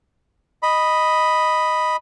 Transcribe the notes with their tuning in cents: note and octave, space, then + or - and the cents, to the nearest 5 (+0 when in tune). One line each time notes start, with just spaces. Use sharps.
D#5 +0 B5 +0